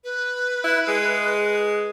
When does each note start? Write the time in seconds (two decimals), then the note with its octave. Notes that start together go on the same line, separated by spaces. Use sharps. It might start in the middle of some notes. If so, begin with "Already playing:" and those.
0.04 B4
0.64 E4
0.88 G#3